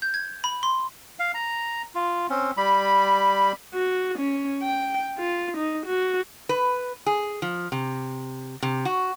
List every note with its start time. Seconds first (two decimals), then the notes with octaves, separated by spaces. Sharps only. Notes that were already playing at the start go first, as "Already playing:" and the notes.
0.02 G6
0.14 G#6
0.44 B5
0.63 C6
1.19 F5
1.34 A#5
1.95 F4
2.30 C4 C#4
2.57 G3 B5
3.74 F#4
4.18 C#4
4.63 G5
5.18 F4
5.57 D#4
5.86 F#4
6.49 B4
7.06 G#4
7.42 F3
7.72 C3
8.62 C3
8.85 F#4